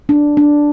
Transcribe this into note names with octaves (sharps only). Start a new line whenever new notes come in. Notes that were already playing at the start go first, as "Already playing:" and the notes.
D4
D4